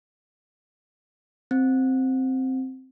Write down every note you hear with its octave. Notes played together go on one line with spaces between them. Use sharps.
C4